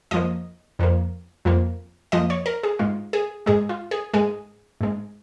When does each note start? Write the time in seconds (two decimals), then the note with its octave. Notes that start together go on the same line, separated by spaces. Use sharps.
0.11 F2 F3 A#3 D#5
0.79 F2 F3 A#3
1.45 F2 F3 A#3
2.12 F2 F3 A#3 D#5
2.30 C#5
2.46 A#4
2.63 G#4
2.79 G#2 G#3 F4
3.13 G#4
3.46 G#2 G#3 G#4
3.69 F4
3.91 G#4
4.14 G#2 G#3 G#4
4.81 G#2 G#3